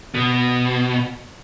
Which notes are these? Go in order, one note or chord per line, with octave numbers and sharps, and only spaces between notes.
B2